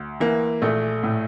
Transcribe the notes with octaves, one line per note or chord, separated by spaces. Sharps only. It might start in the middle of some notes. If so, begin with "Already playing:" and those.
Already playing: D2
E3 A#3
A#1 A3
A2